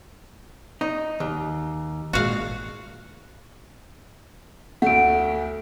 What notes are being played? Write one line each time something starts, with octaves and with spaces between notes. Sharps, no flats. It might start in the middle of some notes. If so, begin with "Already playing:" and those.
D#4
D#2
G#1 A#2 G#3 F#4 F5
D2 A3 F#5 D7